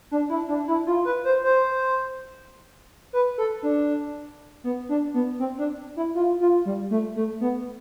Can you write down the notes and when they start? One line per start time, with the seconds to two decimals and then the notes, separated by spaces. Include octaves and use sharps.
0.11 D4
0.30 E4
0.48 D4
0.68 E4
0.87 F4
1.05 B4
1.25 C5
1.44 C5
3.13 B4
3.38 A4
3.63 D4
4.64 B3
4.89 D4
5.14 B3
5.39 C4
5.58 D4
5.96 E4
6.15 F4
6.40 F4
6.65 G3
6.91 A3
7.16 A3
7.41 B3